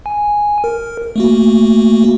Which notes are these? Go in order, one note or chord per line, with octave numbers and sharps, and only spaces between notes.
G#5
A#4
A3 A#3 F#4